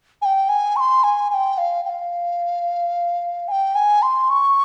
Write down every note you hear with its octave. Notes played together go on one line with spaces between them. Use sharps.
G#5
G5
G#5
C#6
C6
G#5
G#5
G5
F5
G5
F5
G#5
G5
G#5
C6
C#6